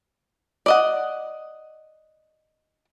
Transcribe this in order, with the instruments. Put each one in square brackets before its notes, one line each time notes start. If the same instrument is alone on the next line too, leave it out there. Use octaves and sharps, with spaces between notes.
[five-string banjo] D5 D#5 F#5